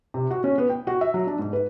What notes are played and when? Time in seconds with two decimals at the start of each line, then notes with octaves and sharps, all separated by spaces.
0.14 C3
0.31 F#4
0.44 C#4
0.58 B3
0.69 G5
0.87 F#4
1.01 E5
1.14 F#3
1.27 D4
1.39 G#2
1.53 B4